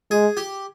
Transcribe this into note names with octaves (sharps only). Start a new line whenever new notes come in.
G#3 G#4
G4